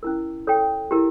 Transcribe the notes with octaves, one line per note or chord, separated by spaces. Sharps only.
C#4 E4 A#4
A4 C#5 G5
E4 G4 A#4